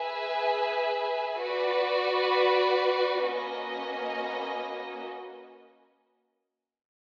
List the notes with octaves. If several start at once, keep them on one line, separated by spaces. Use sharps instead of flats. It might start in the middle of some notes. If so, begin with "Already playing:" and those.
Already playing: G#4 B4 E5 G#5
F#4 B4 D5
A#3 C#4 F#4 B4 D#5